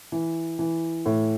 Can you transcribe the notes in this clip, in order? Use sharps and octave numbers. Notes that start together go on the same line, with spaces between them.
E3
E3
A2